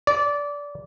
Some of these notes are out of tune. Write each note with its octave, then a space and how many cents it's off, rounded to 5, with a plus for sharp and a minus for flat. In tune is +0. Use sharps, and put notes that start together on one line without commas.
D5 -20